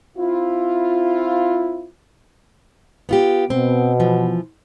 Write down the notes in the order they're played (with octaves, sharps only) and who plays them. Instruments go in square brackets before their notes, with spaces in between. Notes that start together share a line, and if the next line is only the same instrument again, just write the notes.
[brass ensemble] C4 E4 F4
[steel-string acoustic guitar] B3 F4 G4
[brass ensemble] B2 [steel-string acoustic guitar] C4
[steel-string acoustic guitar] E3 F3